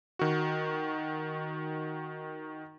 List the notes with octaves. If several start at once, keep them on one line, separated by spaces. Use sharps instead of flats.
D#3 F#4